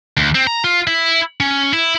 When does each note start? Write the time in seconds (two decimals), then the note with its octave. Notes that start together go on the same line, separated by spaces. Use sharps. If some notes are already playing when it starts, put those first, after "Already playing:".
0.17 D2
0.35 C4
0.47 A#5
0.64 F4
0.87 E4
1.40 C#4
1.73 E4